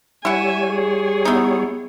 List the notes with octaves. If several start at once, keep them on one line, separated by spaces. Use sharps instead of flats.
G3 E4 C#5 E5 F#5 G#5
G#4
B3 D#4 E4